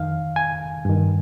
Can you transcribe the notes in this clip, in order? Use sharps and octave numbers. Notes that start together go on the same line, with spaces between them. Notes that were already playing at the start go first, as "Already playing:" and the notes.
Already playing: F2 D#3 F5
G#5
G2 D#3